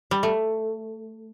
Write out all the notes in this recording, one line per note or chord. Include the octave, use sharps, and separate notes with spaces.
G3
A3